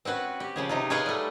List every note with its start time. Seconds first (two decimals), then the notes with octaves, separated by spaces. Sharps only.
0.05 C4 C#4 F#4 B4
0.40 G4
0.56 C#3 F3 G#4
0.69 C3 D#4 F4
0.90 G#4 B4 C#5 D#5 F5 G5
1.06 G3 A3